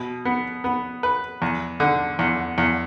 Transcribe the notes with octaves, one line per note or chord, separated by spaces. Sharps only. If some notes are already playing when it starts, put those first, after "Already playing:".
Already playing: B2
B3
B3
B4
E2
D3
E2
E2